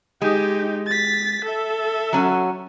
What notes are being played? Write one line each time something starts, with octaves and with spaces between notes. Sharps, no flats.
G#3 D#4 G4
A6 B6
A4 E5
F#3 C#4 F#4